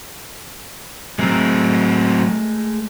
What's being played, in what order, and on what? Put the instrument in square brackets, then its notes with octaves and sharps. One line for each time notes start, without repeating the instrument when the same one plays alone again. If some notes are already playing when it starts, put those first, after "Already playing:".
[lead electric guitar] F#3 C4 [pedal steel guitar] G#3 A3 A#4